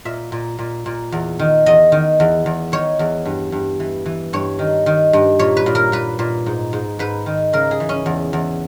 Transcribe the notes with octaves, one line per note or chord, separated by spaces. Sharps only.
A#2 E5
A#2
A#2
A#2
E2
D#3
E2 D#5
D#3
E2
E2
D#3 C#5
E2
G2
G2
E3
E3
G2 C#5
D#3
D#3
G2
A#2 C#5
B4
A#2
A#4
A#2 B4
A#2
G#2
G#2
G#2 B4
D#3
C#3 A#4
G#4
E3
C#4
E2
E2